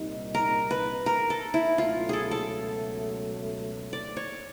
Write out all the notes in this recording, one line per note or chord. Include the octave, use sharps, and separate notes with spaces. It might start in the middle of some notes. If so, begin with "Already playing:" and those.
Already playing: C2 A#2 G3 C4 D#4
A#4
B4
A#4
A4
E4
C#2 B2 F#3 A3 F4
G#4 A4
A4
D5
C#5